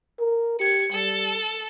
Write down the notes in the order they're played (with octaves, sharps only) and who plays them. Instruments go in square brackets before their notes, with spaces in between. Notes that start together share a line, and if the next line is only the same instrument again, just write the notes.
[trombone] A#4
[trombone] G4 [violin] G#6 C#7
[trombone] G3 [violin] A4